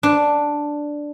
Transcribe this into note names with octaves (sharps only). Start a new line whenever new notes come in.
D4